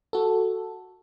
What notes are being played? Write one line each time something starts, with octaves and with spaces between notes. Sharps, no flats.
F#4 A4